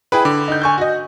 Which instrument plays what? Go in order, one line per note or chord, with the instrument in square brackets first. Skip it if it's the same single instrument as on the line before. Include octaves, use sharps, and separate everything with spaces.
[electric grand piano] E4 G#4 B4 [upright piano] G5 B5
[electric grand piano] D3 D6
[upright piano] D#4 G6
G#5 C#6 G6
F#4 D#5